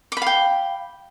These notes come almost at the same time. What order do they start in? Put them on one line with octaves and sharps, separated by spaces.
D6 B5 F5 G5